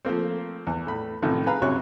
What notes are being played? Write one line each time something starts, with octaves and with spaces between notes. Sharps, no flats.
F3 A3 A#3 C4
E2
A2 B5
A1 A2 C3 D#3 F3
G#4 B4 F5 A#5 B5
F#2 C3 F#3 C#5 C#6 F#6